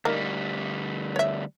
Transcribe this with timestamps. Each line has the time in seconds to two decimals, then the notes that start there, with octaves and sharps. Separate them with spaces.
0.05 D2 G3 A#3 D#4
1.16 C#5 E5